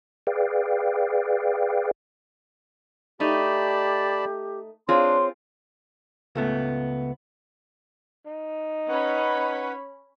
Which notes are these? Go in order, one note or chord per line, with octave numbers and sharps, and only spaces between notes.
G#4 B4 D5 F5 G5
A3 D#4 G4 D5 A5 B5
C4 D4 F4 G#4 C#5 C6
C#2 A3 B3
D#4
C#4 B4 C#5 F#5 B5